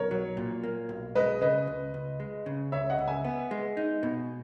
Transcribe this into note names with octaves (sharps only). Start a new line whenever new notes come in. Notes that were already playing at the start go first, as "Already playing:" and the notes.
Already playing: B1 A#4 C#5
F#3
A#2
A#3
B1
G#3 B4 D#5
C#3 B4 D#5
C#2
C#2
G#3
C#3
C#2 C#5 E5
D#5 F#5
C#2
E5 G#5
B3
G#3
D#4
B2